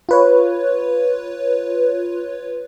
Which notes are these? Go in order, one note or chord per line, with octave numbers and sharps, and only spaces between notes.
F4 B4 C#5